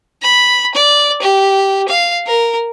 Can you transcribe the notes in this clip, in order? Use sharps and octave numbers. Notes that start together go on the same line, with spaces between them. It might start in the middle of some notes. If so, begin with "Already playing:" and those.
B5
D5
G4
F5
A#4